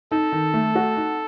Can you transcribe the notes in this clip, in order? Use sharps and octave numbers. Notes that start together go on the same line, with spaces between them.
D#4 A4
D#3
A3
F#4
D#4